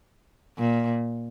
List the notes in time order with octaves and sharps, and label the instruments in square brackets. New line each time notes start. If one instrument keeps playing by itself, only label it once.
[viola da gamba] A#2